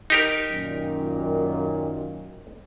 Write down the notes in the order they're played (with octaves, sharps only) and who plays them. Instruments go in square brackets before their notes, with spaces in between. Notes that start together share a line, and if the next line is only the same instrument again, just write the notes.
[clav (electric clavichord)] D#4 G4 A#4
[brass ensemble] F#2 A#2 D#3